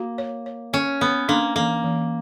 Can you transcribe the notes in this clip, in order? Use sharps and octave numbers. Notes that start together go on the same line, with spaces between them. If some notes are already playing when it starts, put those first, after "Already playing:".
Already playing: A#3 F#4
C#5
C#5
C#4 C#5
B3 C#5
A#3 D4
E3 A#3
E3